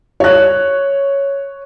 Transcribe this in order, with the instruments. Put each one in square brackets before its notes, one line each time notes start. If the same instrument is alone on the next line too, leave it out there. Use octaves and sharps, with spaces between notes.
[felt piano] C#5 F#6